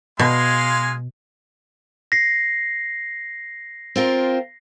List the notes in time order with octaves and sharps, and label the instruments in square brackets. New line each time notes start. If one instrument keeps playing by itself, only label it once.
[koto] B2 [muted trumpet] G#3 [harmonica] F5 G#5 C6
[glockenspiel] A#6 C7
[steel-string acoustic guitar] C4 F4 A#4